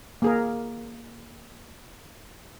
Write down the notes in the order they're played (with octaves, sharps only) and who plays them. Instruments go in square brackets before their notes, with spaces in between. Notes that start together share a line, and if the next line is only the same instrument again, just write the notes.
[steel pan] A#3 G#4 A#4